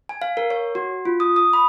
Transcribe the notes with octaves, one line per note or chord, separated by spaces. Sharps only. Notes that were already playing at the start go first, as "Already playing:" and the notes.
G#5
F5
A#4
C#5
F#4
F4
D#6
D#6
B5